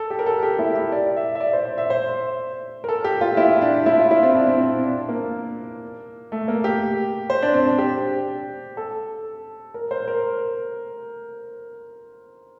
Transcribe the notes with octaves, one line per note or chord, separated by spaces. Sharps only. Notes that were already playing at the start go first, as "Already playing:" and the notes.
Already playing: A4
G4
A#4
A4
G4
E4
G4
D5
E5
E5
D5
C5
D5
E5
C5
A#4
A4
G4
F4
E4
D4
E4
F4
E4
C4
D4
C4
C4
D4
A#3
A3
A#3
G4
C5
D4
C4
D4
G4
A4
A#4
C5
A#4